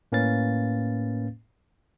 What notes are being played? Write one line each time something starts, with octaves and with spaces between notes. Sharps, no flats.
A2 A#3 C#4 B4 F5 A6